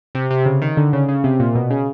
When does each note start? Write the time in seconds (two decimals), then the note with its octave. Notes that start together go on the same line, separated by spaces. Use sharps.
0.15 C3
0.31 C3
0.46 C#3
0.62 D#3
0.77 D3
0.93 C#3
1.08 C#3
1.24 C3
1.40 A#2
1.55 B2
1.70 C#3